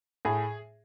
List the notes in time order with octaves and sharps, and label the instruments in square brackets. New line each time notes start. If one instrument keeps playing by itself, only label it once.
[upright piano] A2 G#4